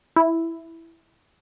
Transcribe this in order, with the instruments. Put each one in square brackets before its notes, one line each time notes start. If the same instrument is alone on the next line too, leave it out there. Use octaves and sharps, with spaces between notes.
[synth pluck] E4